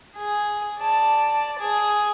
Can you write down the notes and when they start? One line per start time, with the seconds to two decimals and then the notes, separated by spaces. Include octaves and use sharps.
0.16 G#4
0.80 D5 A5
1.59 G#4